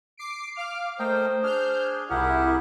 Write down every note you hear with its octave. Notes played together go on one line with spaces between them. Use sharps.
D6 C7 D7
F5 D6 F6
A3 A#4 C5 D#5 G5
D4 G#4 F6 G6
C2 E4 G4 G#4 A#4 F#5